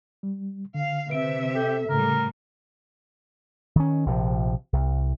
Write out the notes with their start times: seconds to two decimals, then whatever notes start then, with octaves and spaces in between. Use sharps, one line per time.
0.23 G3
0.74 D3 F5
1.10 C3 B4 E5 D7
1.55 G4 A4
1.89 A2 C#3 G3 A#4
3.76 D#3 C#4
4.06 A#1 C3 F3
4.73 C2